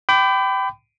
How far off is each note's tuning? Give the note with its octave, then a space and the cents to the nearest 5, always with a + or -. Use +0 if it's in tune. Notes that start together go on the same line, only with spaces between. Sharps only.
G5 -15 B5 +30 D6 +0